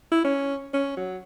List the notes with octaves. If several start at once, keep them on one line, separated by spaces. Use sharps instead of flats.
E4
C#4
C#4
F#3